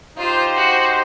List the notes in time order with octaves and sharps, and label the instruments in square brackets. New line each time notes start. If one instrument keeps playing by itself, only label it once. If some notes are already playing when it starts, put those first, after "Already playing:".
[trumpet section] D#4 G4 C5 [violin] F4
[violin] F#4